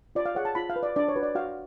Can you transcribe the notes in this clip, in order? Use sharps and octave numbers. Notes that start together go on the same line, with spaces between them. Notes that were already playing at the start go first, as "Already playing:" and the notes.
F4 D5
F5
G#4 C#5 F#5
A5
F4 B5
F5
B4
D5
D4 D5
C#5
F#4 B4
D5
F#4 F5